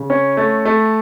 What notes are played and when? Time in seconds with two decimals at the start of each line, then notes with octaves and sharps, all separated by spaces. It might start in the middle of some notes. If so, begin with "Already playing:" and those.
Already playing: C#3
0.10 C#4
0.37 A3
0.65 A3